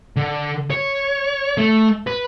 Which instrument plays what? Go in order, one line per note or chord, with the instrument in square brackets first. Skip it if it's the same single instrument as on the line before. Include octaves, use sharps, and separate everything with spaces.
[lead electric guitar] D3
C#5
A3
B4